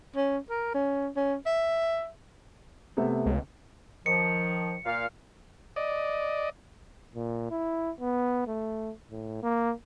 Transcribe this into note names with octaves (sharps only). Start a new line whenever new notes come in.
C#4
A#4
C#4
C#4
E5
C3 A3 B3
C#2
D#3 F3 C#7
A#2 F5
D5 D#5
A#2
E4
B3
A3
A2
A#3